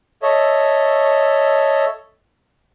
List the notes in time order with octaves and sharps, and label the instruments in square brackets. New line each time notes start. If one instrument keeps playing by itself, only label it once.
[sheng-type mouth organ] A4 C#5 D#5 E5